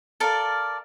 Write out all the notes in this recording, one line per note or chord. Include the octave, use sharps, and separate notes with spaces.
A4 A#4 D5 F5